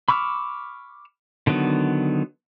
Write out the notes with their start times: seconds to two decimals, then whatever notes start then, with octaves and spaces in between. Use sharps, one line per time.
0.09 B5 C#6 D6 E6 F6
1.47 D3 D#3 F#3 B3